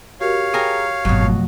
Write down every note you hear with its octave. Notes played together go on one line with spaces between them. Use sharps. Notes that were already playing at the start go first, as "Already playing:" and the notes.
F#4 G4 A#4 C#5 F5
G#4 A#4 G5
G#1 F#2 B2 F#3
F2 F3 A3